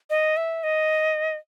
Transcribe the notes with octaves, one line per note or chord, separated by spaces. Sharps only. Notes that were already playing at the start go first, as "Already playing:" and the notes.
D#5
E5
D#5